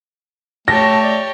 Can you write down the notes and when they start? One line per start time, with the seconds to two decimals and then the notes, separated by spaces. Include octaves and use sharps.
0.68 A3 G4 C#5 A5 A#6
1.02 D5